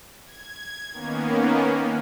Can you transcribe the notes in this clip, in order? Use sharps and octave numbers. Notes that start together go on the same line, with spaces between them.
G#6
D#3 A#3 B3 C#4